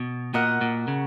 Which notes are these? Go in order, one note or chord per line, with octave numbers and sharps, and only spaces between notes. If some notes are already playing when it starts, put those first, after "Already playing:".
Already playing: B2 F#4
A#2 F#4 A#4 D#5 F#5
A#2
C#3